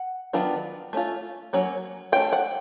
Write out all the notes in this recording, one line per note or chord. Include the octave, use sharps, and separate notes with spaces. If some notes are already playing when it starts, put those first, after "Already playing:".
Already playing: F#5
D#3 F#3 B3 D4 F4
A3 C#4 F4
F#3 A#3 C#4
A3 C#4 F4 G5
F#5